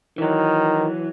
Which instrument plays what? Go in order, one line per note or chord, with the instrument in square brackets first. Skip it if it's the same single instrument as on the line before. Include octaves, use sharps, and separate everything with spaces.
[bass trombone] D#3 [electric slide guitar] E3 F#3